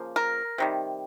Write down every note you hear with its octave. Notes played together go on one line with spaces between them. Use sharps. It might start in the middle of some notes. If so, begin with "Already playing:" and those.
Already playing: C#3 F3 A#3
A#4
C3 D#3 G3